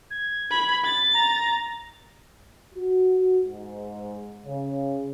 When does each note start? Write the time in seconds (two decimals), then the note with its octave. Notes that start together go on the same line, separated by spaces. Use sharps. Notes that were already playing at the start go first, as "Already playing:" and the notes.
0.11 G#6
0.51 B5
0.85 A6
1.14 A#5
2.74 F#4
3.44 G#2
4.44 C#3